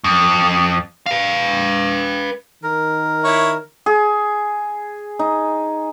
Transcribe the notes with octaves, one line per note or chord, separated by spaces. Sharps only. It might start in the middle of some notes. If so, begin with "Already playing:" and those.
F2
B4 F5
D#3 A#4
E4 C#5
G#4
D#4